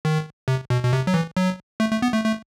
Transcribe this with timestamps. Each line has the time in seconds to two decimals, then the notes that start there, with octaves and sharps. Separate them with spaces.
0.05 D#3
0.48 C3
0.70 B2
0.84 B2
0.93 C3
1.07 F#3
1.14 E3
1.36 F#3
1.80 A3
1.91 A3
2.02 B3
2.14 A3
2.25 A3